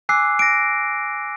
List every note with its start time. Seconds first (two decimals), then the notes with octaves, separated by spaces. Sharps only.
0.09 G#5 D6 E6 F#6 C7
0.39 A#6 D7